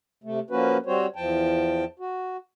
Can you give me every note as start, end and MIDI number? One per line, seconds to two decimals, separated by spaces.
0.24 0.40 48
0.24 0.40 57
0.50 0.77 53
0.50 0.77 58
0.50 0.77 61
0.50 0.77 66
0.50 0.77 71
0.86 1.06 55
0.86 1.06 60
0.86 1.06 66
0.86 1.06 72
0.86 1.06 73
1.16 1.84 40
1.16 1.84 53
1.16 1.84 79
1.16 1.84 81
1.99 2.37 66